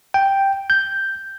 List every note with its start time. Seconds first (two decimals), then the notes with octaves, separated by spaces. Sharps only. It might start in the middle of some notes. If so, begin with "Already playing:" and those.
0.14 G5
0.70 G6